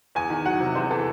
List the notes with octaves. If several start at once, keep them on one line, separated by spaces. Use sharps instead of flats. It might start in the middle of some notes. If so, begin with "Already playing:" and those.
E2 G#5
D#3
F#3 F#5
C3
E2 C5
E3 A4